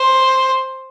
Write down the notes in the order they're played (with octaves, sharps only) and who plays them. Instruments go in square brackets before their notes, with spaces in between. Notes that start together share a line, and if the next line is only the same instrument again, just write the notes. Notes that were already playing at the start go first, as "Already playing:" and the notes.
Already playing: [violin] C5